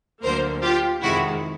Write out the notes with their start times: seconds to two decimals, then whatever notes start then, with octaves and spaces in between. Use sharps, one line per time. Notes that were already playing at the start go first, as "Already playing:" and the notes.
0.23 D2 D3 F#3 A#3 A#4 C5
0.63 F4 G4
1.02 F2 C3 D#3 G#3 E4 F#4